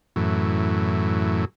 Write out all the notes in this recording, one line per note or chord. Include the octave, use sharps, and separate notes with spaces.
F#2 A2 E3